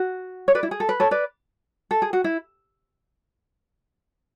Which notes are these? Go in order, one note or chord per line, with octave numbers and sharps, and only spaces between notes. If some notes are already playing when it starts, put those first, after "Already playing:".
Already playing: F#4
C#5
B4 D5
E4
G#4
A4
B4
A4 C#5
B4 D5
A4
G#4
F#4
E4